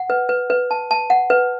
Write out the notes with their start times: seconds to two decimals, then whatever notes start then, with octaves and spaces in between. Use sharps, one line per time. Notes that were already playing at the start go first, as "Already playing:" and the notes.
Already playing: F#5
0.10 B4
0.29 B4
0.50 B4
0.71 A5
0.91 A5
1.10 F#5
1.30 B4